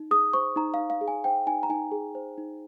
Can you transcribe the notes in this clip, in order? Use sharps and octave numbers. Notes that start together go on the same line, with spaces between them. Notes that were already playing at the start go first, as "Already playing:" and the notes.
Already playing: D#4
G#4 D#6
C5 C#6
D#4 A#5
F5
D#4
F5
G#4
G#5
C5 G5
D#4 G#5
A#5
D#4 G#5
G#4
C5
D#4